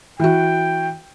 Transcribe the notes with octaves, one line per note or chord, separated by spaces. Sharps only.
E3 F#4 G5